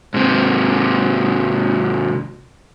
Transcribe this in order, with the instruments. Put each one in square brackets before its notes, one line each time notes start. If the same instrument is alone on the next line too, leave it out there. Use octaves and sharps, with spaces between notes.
[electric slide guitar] G#2 C3